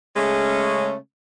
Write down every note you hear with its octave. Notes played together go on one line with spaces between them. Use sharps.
C#3 G#3 A3 C#4